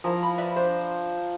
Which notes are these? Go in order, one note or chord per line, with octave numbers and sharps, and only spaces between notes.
F3 E4 A#4 A#5
B5
B4 D5 E5
D4 C5